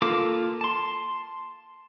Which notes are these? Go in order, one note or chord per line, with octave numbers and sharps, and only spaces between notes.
A#3 F4 A4 D6
A5 C6